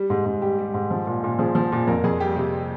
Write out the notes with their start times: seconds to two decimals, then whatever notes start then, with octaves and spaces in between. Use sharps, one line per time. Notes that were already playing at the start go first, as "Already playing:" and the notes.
Already playing: G3
0.10 G#2
0.26 G#2
0.42 G3 G4
0.59 G3
0.74 G#2
0.91 F3
1.07 A#2
1.24 A#2
1.39 F3 G#4
1.55 F3
1.72 A#2
1.87 F2 A#4
2.04 F2 G#4
2.20 G3 G4
2.36 C3